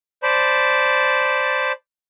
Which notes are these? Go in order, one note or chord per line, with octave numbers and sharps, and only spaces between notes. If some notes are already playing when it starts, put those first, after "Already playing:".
C5 D5 A5 B5